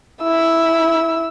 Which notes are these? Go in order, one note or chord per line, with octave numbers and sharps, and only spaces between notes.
E4 E6